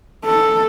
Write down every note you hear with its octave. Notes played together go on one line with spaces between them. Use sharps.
A4